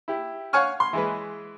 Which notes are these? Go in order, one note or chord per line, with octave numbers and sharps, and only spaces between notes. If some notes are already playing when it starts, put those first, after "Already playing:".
E4 G4
C#5 F5 F#5 G#5 C#6 F6
C6
E3 G#3 B4